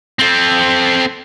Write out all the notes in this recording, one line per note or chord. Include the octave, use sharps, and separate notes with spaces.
C4 A4